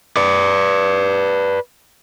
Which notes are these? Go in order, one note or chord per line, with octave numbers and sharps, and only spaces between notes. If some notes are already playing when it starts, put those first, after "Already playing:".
B4 D5